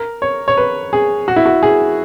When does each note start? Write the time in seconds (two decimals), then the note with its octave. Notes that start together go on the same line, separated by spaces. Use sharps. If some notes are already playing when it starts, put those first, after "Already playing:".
Already playing: A#4
0.22 C#5
0.48 C#5
0.57 B4
0.93 G#4
1.28 F#4
1.36 E4
1.46 F#4
1.63 G#4